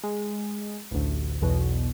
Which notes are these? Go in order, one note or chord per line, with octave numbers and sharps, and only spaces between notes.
G#3
A1 D2
B1 E2 B2